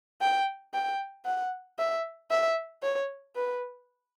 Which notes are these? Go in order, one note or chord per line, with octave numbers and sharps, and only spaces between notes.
G5
G5
F#5
E5
E5
C#5
B4